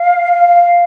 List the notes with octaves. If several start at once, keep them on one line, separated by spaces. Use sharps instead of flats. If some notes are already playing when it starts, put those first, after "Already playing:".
Already playing: F5
F5